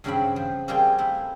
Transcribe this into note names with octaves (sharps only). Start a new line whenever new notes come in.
G2 C#3 F#3 C4 F#4 B5
F3
G3 A#3 C4 F4 G4 G#4
A3 E4